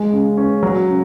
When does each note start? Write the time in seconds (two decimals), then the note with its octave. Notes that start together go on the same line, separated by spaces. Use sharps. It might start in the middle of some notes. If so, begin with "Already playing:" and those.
Already playing: G#3
0.13 C#3
0.37 C#4
0.63 F#3
0.88 C#3